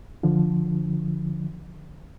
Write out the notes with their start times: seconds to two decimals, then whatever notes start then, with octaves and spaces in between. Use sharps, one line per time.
0.23 D3 F3